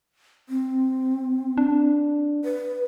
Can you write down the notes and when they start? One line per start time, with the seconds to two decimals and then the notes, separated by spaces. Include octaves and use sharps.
0.49 C4
1.58 D4
2.44 B4